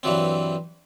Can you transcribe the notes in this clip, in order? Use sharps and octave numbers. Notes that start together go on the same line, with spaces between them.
G2 E3 F#3 C4